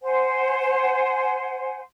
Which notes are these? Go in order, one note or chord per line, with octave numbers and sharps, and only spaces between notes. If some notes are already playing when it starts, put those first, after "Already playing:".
C5 F#5 G#5